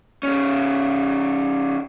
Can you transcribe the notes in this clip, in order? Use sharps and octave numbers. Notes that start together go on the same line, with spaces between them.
D#3 C#4